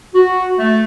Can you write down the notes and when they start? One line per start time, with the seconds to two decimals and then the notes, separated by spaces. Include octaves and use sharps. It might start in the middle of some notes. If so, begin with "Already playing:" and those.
0.14 F#4
0.58 A3